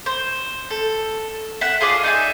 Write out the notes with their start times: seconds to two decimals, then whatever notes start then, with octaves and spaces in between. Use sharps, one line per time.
0.06 C5
0.71 A4
1.61 E5 F#5
1.81 F4 G#4 A4 D5
2.03 D#4 D5 E5 G#5